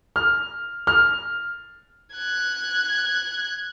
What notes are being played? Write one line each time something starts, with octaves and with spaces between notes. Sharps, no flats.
F6
F6
F#6 G#6